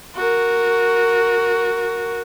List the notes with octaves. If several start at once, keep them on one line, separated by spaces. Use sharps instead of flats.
F#4 A#4